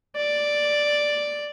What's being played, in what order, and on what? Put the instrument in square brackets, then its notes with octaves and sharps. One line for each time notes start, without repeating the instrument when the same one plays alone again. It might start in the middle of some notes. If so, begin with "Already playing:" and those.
[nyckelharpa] D5